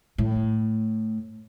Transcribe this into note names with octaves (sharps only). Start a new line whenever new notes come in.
A2